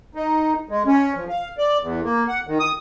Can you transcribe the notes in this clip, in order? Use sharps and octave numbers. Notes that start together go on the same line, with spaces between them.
D#4
G#3
C#4
F3
F5
D5
E2
A#3
F#5
D#3
D#6